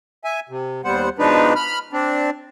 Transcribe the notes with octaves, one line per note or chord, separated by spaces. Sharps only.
E5 G#5
C3
D#2 G3 B3 C5 F#5
B2 F3 G#3 D4 D#4 B4
B5 F6
C4 D4